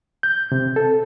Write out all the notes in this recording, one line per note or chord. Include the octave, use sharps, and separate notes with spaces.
G6
C3
A4